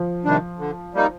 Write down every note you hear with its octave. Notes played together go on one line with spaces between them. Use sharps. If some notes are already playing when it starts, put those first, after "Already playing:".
Already playing: F3
C3 D#3 G3 D4
D3
G3 A#3 D#4